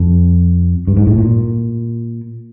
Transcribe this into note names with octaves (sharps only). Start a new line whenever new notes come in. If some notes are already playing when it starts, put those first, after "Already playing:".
Already playing: F2
G2
G#2
A2
A#2